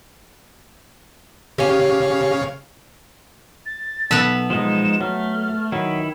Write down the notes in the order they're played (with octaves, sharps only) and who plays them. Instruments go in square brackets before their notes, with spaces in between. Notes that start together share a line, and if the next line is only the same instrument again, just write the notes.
[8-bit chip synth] C#3 C#5 F5 [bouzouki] G4 G#5
[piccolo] A6
[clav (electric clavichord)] B1 A4 [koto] B3 B4 E5
[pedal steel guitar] F3 G#3 D#4 [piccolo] E7
[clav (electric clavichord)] F#3 [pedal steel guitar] A3 [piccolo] F6
[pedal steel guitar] D#3 E4 [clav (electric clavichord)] F#3 [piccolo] B5